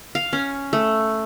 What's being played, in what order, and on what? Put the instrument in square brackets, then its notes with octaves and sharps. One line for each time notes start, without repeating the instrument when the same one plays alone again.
[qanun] F5
C#4
A3